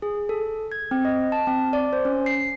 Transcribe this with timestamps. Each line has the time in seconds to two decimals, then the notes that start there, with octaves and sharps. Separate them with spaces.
0.02 G#4
0.29 A4
0.72 G#6
0.91 C4
1.05 D#5
1.32 A5
1.47 C4
1.73 D5
1.93 C5
2.05 C#4
2.26 C7